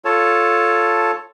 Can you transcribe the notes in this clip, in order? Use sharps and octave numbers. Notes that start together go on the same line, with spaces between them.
F4 A4 C#5 A5